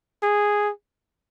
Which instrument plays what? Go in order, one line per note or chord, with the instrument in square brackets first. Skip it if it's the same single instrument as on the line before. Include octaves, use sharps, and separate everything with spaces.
[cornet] G#4